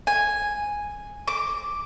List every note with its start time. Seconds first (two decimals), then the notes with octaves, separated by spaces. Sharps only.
0.07 G#5
1.28 D6